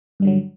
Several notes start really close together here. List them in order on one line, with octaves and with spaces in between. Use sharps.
G2 G3 D3 F#3